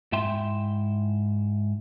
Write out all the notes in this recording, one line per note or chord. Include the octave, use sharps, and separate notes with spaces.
G#2 E4 E5 G5 C6